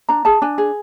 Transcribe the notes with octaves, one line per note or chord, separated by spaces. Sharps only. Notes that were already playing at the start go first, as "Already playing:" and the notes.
D4 A#5
G#4 A5
D4 G#5
G#4